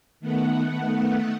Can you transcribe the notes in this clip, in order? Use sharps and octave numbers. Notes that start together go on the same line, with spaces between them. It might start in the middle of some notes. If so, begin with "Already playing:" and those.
D#3 A3 B3 F#5